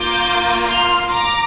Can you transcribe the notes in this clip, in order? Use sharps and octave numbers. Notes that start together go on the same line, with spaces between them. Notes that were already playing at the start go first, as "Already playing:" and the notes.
Already playing: A#3 F4 D6 G6
C6 F6
A#5 D6